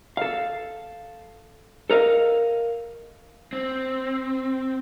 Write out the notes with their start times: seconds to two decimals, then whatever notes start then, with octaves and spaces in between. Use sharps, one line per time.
0.17 A4 F5
1.90 A4 A#4 D#5 F5
3.53 C4